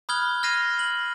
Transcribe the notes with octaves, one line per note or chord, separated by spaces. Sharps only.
B5 D#6 F6 F#6 G#6 G7
F6 G#6 A#6 C7 D#7 F7
F#7